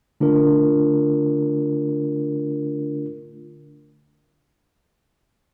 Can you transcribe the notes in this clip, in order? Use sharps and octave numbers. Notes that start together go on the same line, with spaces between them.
D3 A3 D4 F4 A#4